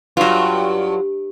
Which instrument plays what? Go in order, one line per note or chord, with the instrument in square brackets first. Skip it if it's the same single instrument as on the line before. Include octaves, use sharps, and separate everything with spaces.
[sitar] G2 [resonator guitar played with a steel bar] F#3 F4